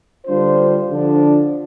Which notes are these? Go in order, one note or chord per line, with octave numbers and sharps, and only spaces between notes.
D3 G3 D4 F4 C5
D3 F3 D4